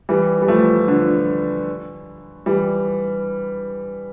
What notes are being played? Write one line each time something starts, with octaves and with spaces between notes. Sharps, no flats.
E3 G3
G3
F3 A3
D3 F3
E3 G3